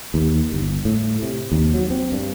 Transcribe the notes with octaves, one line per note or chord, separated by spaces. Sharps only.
D#2
G1
A2
C3
D#2
F#3
C4
G2